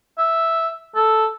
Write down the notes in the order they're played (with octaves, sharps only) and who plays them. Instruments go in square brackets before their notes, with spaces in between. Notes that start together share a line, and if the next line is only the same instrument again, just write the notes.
[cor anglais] E5
A4